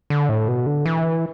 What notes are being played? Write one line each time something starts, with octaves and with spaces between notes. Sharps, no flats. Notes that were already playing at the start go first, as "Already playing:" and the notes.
D3
A2
B2
D3
E3